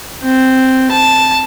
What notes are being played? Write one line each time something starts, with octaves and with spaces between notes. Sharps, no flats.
C4
A5